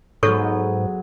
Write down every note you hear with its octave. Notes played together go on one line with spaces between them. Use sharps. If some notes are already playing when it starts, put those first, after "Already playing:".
G#2 F#3 G#3 B3 A4 C#5 C#6